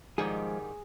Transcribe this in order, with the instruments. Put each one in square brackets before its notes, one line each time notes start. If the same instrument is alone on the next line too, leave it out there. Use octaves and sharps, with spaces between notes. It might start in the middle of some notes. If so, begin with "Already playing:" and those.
[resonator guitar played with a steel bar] G#2 D#3 G3 [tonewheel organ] F3 G#3 [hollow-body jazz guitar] G#4